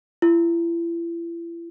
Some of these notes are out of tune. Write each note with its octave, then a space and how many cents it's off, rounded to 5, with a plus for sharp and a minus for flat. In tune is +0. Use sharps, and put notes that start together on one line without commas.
E4 +40